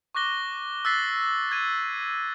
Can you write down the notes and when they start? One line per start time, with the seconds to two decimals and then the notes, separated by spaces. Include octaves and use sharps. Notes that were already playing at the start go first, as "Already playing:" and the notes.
0.15 C#6 D6 F#6 A#6 G7
0.85 E6 F#6 A6 B6 C7
1.51 G#6 D#7